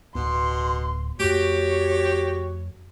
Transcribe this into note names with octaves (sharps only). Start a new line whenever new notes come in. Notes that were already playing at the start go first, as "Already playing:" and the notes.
D1 B2 B3 C6
F2 A3 F#4 G4 C#5